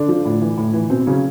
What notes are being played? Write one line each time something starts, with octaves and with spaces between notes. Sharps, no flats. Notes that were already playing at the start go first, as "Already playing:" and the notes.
Already playing: D3 D4
F3
A2
E3
A2
E3
B2 C4
C#3 F#3 C#4